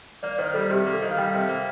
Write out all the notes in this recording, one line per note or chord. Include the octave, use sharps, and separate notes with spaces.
A#3 D5
D#3 C5
G3 A4
C3 G4
A#3
A4
D#3
F5
G3 G5
C3
A#3